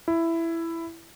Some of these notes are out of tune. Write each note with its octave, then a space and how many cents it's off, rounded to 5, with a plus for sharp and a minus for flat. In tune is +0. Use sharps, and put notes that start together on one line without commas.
E4 +10